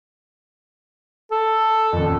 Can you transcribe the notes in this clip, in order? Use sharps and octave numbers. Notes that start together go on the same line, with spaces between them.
A4
D#1 F2